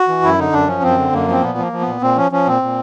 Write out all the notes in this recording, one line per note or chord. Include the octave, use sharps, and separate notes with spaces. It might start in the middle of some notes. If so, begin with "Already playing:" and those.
Already playing: F#4
E3
F#2 E4
D3 D#4
F#2 D4
F3 C#4
F#2 C4
D3
F#2 A#3
F3 C4
A#2 B3
F3 A#3
F3
B3
A#2
A#2 C4
F3 C#4
F3 C#4
A#2 C4
A#2